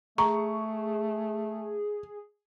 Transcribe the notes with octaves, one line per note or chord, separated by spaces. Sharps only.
A3 G#4 A#5 C#6